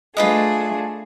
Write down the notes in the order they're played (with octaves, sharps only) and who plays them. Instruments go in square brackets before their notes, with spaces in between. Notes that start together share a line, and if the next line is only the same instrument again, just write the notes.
[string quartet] A3 D4 G#4 [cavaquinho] F4 B4 D#5